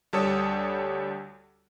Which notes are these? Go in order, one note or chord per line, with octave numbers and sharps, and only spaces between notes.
D2 G3 A4 C#5 D#6